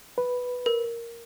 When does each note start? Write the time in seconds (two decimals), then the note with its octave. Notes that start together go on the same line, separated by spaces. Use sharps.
0.18 B4
0.66 A#4